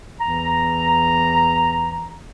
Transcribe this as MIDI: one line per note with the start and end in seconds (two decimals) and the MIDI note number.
0.21 2.20 40
0.21 2.20 52
0.21 2.20 82